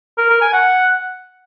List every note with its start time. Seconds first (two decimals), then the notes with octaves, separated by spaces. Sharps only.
0.18 A#4
0.29 A#4
0.41 G#5
0.53 F#5